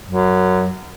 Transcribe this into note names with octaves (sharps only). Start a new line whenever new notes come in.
F#2